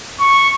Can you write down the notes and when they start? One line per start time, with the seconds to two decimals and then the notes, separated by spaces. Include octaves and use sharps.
0.20 C#6